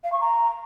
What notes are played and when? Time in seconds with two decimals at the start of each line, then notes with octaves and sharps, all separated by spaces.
0.04 F5
0.12 C#6
0.21 A#5